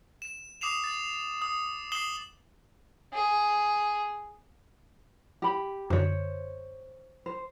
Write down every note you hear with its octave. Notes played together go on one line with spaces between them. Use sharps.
E7
D6 D#6 C7 E7 F7
A6
D#6
D#6 C7 E7 F#7 G7
G#4
G4 B5
F#2 D3 C5 C#5
C5